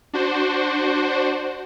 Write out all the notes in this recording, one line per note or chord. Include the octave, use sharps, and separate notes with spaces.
D4 F#4 C5